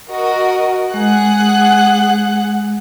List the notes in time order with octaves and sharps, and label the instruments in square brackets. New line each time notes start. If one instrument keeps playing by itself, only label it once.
[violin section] F#4 A#4 D#5
[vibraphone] G#3 [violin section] G#4 F#5 F#6